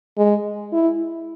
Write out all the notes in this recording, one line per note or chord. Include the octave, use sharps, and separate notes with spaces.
G#3
E4